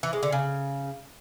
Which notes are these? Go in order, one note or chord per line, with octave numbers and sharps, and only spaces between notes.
E3
G#3
D3
C#3